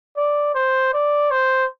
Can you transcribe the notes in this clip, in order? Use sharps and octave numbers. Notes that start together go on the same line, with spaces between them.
D5
C5
D5
C5